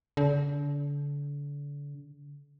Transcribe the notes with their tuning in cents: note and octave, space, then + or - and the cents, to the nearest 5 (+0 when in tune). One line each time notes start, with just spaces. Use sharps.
D3 -35